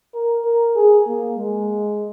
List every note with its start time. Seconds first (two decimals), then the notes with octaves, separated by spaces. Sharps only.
0.14 A#4
0.45 A#4
0.76 G#4
1.08 A#3
1.38 G#3